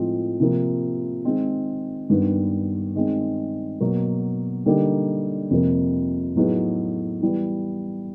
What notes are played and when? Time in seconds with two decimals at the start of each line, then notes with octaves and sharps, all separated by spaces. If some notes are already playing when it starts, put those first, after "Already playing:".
Already playing: A2 F3 G#3 C4
0.40 C3 F3 A#3
1.25 D#3 G#3 C4
2.09 G2 D#3 G3 B3
2.95 D#3 G#3 C4
3.80 B2 F#3 A#3
4.66 D3 G3 A#3 D#4 G4
5.50 F2 C3 F3 A#3
6.36 A2 F#3 B3 D#4 G#4
7.22 E3 G3 B3